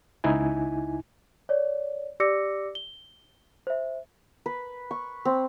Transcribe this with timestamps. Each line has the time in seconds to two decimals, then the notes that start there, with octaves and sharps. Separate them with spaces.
0.24 C#2 D#4 E4 G#5
1.49 C#5 D5
2.20 G4 D5 D6 E6 A#6 C#7
2.75 G7
3.67 C5 E5
4.46 B4
4.91 C#6
5.25 C4